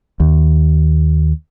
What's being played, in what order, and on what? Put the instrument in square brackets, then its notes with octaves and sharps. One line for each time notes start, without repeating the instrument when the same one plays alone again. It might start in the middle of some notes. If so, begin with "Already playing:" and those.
[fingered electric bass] D#2